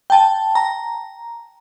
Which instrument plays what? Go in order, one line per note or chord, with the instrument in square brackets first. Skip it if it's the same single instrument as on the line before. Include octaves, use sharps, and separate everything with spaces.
[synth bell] G5 A5
A#5